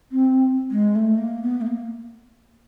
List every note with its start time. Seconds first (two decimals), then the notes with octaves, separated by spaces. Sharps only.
0.11 C4
0.71 G#3
0.95 A3
1.18 A#3
1.42 B3
1.61 A3
1.66 A#3